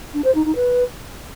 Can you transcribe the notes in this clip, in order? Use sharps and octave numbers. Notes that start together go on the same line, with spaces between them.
D4
C5
D#4
D#4
B4